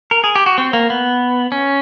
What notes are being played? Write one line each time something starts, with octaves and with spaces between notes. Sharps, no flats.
A#4
G#4
G4
F#4
C4
A#3
B3
C#4